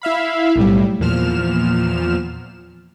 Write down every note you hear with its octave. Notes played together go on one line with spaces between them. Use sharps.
E4 E5 F5 B5
B1 A2 G3
E2 A#2 F3 F6 E7